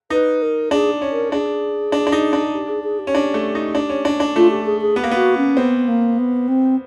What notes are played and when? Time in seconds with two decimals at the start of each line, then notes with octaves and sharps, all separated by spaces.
0.10 D#4 B4
0.42 A#4
0.71 D4 G#4
1.01 C#4
1.11 A#4
1.32 D4 G#4
1.92 D4
2.07 D4
2.12 D#4
2.33 D4
2.54 G4
2.68 G#4
2.83 G#4
2.99 G4
3.07 C#4
3.15 D4
3.34 A3
3.55 D#4
3.75 D4
3.89 C#4
4.05 D4
4.20 D4
4.36 A3 F4
4.50 G4
4.65 G#4
4.80 G#4
4.96 B3 G4
5.04 A#3
5.11 B3 F#4
5.37 C#4
5.57 B3 C4
5.87 A#3
6.18 B3
6.48 C4